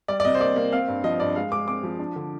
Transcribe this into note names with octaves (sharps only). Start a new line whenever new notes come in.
G3 D5
D5
C3 D#5
C5
A#3 D5
A#3
C4 F5
G2
F3 D#5
G2 D5
G#3 F5
G#3 D6
C4 D6
F3
D4
D3